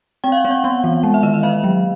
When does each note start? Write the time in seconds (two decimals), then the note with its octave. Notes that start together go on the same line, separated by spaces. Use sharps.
0.24 C4 G5
0.32 F5
0.37 F#5
0.45 C4
0.51 F#5
0.64 B3 F#5
0.84 E3
1.03 G#3
1.14 E5
1.23 D#3 D#5
1.34 E5
1.43 A#3 F5
1.64 F#3